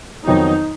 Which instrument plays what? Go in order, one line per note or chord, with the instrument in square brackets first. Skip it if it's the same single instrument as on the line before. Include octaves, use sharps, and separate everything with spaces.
[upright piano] F2 D#3 F#3 B3 [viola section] D#4